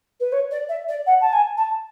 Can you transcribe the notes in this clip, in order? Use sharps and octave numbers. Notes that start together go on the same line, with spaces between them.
B4
C#5
D5
E5
D5
F#5
A5
G#5
A5